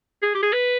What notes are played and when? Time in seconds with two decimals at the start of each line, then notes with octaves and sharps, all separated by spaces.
0.22 G#4
0.35 G4
0.42 G#4
0.53 B4